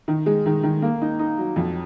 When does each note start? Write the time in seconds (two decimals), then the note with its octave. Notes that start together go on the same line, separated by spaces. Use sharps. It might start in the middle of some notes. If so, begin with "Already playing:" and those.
0.08 D#3
0.26 G#3
0.46 D#3
0.63 D#3
0.82 A#3
1.02 D#4
1.19 D#4
1.38 F#3
1.56 F2